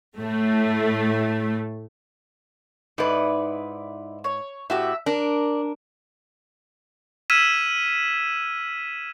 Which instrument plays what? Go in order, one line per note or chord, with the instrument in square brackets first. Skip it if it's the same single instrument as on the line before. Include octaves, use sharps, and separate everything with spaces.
[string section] A2 A3
[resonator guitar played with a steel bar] G#2 B4 [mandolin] D#4 E4 D5
[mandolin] C#5
[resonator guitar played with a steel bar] A2 F#4 G4 [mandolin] E5
[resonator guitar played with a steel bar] D4 [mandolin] A#4
[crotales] E6 F6 G#6 B6 D#7 E7